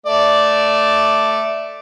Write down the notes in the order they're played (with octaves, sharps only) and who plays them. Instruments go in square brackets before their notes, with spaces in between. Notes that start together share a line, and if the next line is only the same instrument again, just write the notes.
[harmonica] A3 D5